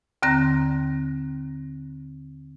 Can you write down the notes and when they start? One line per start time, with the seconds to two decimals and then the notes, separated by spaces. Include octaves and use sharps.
0.23 D#2 D3 C4 A#5 F#6 A#6